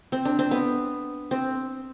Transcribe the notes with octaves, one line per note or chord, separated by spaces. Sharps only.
C4
D4
C4
B3
C4